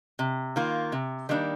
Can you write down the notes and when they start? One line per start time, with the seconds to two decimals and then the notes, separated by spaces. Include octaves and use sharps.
0.19 C3
0.56 D#3 A#3 F4
0.92 C3
1.29 D#3 G3 A#3 D4